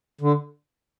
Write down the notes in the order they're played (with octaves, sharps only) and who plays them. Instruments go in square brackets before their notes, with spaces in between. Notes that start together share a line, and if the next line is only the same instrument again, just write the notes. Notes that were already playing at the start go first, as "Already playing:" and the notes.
[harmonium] D3